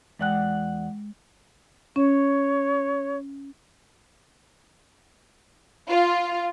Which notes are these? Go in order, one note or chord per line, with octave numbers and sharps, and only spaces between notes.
E2 G#3 D5 F#5 G5 F#6
C#4 C#5
F4